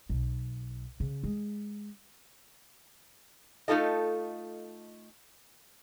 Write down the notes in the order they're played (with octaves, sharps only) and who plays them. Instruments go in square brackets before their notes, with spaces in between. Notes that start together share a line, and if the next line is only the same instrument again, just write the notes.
[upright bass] B1
C#3
G#3
[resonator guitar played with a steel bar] A3 D#4 F4 A4 D#5